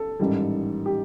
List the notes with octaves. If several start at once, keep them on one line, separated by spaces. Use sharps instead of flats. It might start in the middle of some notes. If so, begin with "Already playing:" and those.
Already playing: A4
A1 G#2 D#3 G3
G4